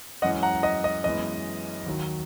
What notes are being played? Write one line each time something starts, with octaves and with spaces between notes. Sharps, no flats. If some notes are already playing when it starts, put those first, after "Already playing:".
F#2 E3 G#3 C#4 D#5 F#5
F#5 A#5
D#5 F#5
D#5
F#2 E3 G#3 B3 D#5
D#2 D#3 F#3